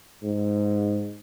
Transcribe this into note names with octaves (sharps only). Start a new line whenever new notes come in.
G#2